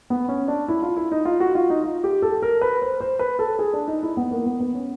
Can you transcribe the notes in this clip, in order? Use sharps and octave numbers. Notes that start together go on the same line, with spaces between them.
B3
C#4
D4
E4
F4
E4
D#4
F4
F#4
F4
D#4
F4
G4
A4
A#4
B4
C5
C5
B4
A4
G#4
D4
D#4
E4
B3
A#3
B3
B3
C#4